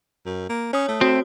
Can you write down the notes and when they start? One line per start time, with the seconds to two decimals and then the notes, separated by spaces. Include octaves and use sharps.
0.26 F#2
0.49 A#3
0.73 C#4 C#5 D#6
0.88 A3
1.01 C4 F#4